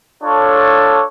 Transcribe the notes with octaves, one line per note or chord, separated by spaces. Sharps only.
D4 F4 A4 C#5